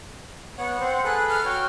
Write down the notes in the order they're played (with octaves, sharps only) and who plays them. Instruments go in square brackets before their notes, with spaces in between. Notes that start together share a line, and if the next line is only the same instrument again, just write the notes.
[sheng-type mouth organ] B3 C#5 [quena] F#5
[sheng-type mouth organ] C4 C5
[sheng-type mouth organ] G#4 A4 B4 [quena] F#6
[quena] F6
[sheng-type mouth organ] F#4 C#5 G5